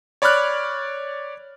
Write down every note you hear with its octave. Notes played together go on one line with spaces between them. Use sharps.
C#5 D5 B5 D6 F6 F#6